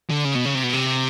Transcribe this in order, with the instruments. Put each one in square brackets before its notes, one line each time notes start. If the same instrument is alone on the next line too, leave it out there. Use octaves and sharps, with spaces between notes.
[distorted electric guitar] D3
C#3
B2
C#3
C3
B2
C3